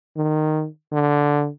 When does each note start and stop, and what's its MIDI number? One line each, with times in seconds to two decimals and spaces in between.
0.16 0.66 51
0.92 1.48 50